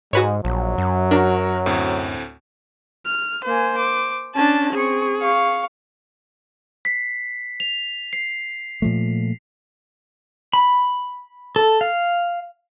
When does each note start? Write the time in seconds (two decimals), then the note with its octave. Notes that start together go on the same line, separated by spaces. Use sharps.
0.13 G#2 G#3 F#4 B4 C#5
0.45 A#1 F#3
0.78 F#2
1.11 D4 F#4 A#4
1.66 D2 A2 C4
3.05 F6
3.45 A#3 C5 G#5
3.77 D6
4.35 C#4 D4 A5
4.73 C4 G#4 C#6
5.21 F5 C#6
6.85 B6 C7
7.60 F7
8.13 C7
8.82 A#2 F3 A3
10.53 B5
11.56 A4
11.81 F5